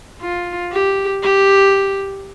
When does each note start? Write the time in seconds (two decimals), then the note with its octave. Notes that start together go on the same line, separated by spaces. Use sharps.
0.22 F4
0.72 G4
1.23 G4